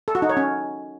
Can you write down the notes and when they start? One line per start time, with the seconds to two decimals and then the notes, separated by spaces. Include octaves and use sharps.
0.08 A4
0.15 F#4
0.22 D#4
0.29 C#5
0.37 C#4